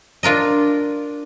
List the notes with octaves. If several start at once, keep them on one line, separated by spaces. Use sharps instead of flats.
D4 F4 A#4 D#5